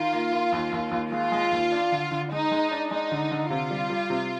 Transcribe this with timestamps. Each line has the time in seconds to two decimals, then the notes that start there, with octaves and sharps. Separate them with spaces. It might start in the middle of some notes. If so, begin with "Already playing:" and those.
Already playing: D#3 F4
0.13 A#3
0.32 A#3
0.52 D#2
0.72 D#2
0.91 D#2
1.12 G#3 F4
1.32 G#3
1.52 D#2
1.72 D4
1.92 D3
2.11 D3
2.31 G#3 D#4
2.51 G#3
2.71 D4
2.91 G#3 D#4
3.11 D3
3.31 D3
3.50 C3 F4
3.71 G3
3.90 G3
4.10 C3